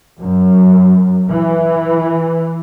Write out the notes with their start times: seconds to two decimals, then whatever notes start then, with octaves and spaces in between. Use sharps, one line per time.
0.19 F#2
1.29 E3